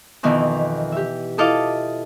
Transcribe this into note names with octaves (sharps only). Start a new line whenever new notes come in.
F2 B2 D#3 E3
G4 E5
E4 F4 A4 D#5 F5 D6